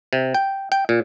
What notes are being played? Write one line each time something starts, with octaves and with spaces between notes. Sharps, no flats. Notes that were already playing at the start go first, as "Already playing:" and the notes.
C3
G5
G5
A#2